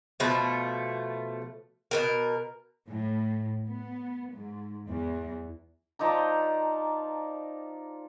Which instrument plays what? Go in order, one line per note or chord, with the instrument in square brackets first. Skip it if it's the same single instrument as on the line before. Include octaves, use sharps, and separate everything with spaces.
[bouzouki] B2 F3 A3
B2 E3 A#4
[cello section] A2
B3
G#2
E2
[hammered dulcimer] F3 D#4 D5 A#5